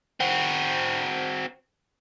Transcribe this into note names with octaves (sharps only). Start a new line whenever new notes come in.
C4 F#4